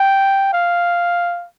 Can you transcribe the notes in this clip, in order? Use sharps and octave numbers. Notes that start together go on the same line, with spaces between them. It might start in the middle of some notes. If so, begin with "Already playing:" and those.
Already playing: G5
F5